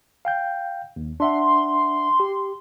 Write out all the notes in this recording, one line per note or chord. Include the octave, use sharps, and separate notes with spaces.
F5 G5 G6
D#2
D4 E5 F#5 C6
G4